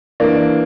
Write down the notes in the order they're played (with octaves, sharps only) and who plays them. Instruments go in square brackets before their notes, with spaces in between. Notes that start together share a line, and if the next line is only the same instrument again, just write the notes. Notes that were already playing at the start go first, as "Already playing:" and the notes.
[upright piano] E3 A#3 D4